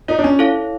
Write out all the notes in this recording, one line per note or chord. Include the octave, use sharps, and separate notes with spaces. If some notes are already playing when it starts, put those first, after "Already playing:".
D#4 F4 A#4 D5
D4
C#4
E4 A4 C#5 F5